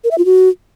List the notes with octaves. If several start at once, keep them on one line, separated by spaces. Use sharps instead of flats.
A#4
E5
F4
F#4